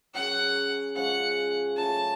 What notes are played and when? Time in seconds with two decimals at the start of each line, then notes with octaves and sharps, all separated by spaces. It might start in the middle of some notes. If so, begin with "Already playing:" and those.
0.14 F#3 C#4 G#4 F#5
0.96 C#3 F3 G#3 C#4 F#5
1.76 F#3 A3 C#4 F4 A5